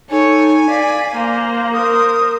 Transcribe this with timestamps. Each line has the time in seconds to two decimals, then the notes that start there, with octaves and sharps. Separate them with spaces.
0.11 D#4 A4 C#5 G#5
0.69 D5 F5 B6
1.16 A#3 C5 A#5
1.74 A#4 C5 D#6